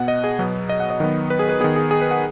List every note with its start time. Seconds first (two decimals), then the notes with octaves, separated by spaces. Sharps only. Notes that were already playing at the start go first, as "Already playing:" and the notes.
Already playing: B2 B3 F#5
0.08 D#5
0.24 G#4
0.39 B2 F#3 B3
0.69 D#5
0.80 F#5
0.90 D#5
1.00 D#3 F#3 B3
1.30 B4
1.39 G#4
1.49 B4
1.60 D#3 B3 G#4
1.76 G#4
1.91 G#4
2.01 B4
2.11 F#5